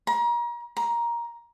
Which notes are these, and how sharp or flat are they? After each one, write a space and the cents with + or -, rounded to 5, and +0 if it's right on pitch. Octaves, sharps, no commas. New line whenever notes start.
A#5 +35
A#5 +10